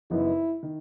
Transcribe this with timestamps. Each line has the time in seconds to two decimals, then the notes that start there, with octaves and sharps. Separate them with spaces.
0.11 F#1 F#2 E3 B3 D#4 E4
0.63 D#3